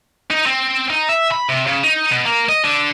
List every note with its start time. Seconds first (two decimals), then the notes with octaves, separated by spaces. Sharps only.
0.31 D#4
0.46 C4
0.90 D#4
1.09 E5
1.31 B5
1.49 C3
1.67 C#3
1.84 D#4
2.12 B2
2.26 A#3
2.49 D#5
2.64 D3